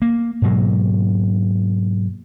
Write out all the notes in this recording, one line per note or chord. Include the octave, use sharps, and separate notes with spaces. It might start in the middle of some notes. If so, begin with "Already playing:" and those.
A#3
G#2 B2 F#3 A#3